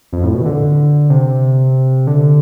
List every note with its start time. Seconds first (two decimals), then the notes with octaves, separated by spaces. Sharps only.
0.13 F2
0.24 A2
0.35 B2
0.42 E3
0.46 D3
1.10 C3
2.07 D3